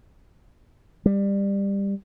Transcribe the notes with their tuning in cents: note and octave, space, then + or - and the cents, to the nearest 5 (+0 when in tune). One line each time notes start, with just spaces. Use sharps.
G3 +20